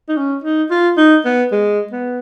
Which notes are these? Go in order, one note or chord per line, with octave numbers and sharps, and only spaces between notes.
D#4
C#4
D#4
F4
D#4
B3
G#3
B3